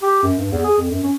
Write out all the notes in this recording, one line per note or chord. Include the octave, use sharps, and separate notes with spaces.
G4
F#2
G2
E2
G#4
F2
F#2
C#4